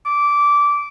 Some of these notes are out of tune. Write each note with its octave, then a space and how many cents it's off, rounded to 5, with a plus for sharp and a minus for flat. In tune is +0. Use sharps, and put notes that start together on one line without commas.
D6 -15